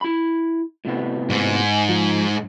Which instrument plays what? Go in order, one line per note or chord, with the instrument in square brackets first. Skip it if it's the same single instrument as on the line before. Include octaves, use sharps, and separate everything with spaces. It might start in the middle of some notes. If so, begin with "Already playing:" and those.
[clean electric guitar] E4 B5
A2 C3 B3
[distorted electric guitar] G#2
[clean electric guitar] F3